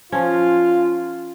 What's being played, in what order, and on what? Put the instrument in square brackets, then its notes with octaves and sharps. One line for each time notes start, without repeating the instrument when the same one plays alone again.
[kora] F3 C#4 [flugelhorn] F4